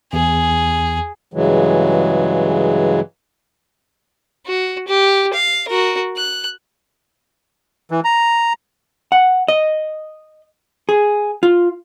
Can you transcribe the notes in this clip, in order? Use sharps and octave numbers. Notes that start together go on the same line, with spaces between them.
E2 G#4
G2 C#3 E3 F#3 G#3
F#4
G4
F5
F#4 A#4
F#6
E3
A#5
F#5
D#5
G#4
F4